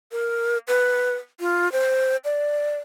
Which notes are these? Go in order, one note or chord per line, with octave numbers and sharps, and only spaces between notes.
A#4
B4
F4
C5
D5